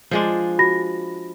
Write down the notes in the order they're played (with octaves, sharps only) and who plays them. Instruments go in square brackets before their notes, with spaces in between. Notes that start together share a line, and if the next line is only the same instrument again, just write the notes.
[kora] F3 G#3 D4
[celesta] F#4 B5 A#6